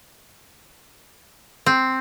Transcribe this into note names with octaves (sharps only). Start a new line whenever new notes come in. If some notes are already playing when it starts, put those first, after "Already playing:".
C4